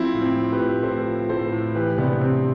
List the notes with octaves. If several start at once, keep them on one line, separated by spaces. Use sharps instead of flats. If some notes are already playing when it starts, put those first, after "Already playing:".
Already playing: F3 C4 E4
A2
C4
F3
G4 B4
A2
A2 A4 C5
F3
A2 A4 C5
A2
E3 G4 B4
C3 B3 D4
C3 C4